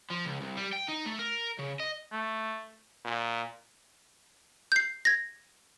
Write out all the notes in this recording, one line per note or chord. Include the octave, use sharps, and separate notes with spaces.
F3
C#2
C2
G3
G5
D#4
A3
A#4
C#3
D#5
A3
A#2
G6 C7
G#6 A#6